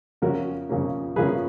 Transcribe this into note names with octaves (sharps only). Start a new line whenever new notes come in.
F2 C#3 F3 A#3 C#4 F#4 A#4
F2 C#3 F3 A#3 C#4
F2 C#3 F3 A#3 C#4 G#4 B4